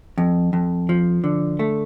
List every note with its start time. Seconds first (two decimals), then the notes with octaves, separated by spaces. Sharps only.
0.18 F2
0.53 F2
0.89 F3
1.24 D3
1.59 A3